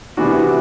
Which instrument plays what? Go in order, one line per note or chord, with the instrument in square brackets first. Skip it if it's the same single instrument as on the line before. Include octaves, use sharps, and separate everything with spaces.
[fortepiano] C3 E3 B3 D4 F#4